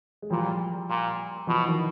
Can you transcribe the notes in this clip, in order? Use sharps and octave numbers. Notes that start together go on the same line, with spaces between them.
G#3
A#2 F3 G3
A#2
B2 F3
E3
D#3 F3